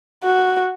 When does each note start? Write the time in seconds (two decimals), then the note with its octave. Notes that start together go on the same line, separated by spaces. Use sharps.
0.24 F#4